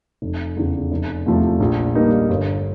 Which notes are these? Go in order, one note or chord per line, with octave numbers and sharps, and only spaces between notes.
F1
E2 C#3
F1
E2 C3 F3 A3
A#1
A#2 G3 A#3 D#4
G1